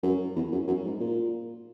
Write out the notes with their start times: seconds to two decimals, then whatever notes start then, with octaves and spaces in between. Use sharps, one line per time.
0.03 F#2
0.36 E2
0.52 F#2
0.68 F#2
0.84 G#2
1.00 A#2